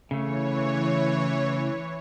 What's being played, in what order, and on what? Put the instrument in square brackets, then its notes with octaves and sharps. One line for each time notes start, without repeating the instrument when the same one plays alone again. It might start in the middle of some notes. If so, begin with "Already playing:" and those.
[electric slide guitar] C#3 A3 [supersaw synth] E3 C#5